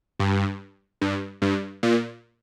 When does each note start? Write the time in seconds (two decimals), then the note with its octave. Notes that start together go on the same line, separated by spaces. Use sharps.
0.20 G2
1.02 G2
1.42 G2
1.83 A#2